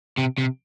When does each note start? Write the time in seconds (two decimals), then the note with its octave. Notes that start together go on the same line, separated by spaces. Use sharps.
0.18 C3
0.38 C3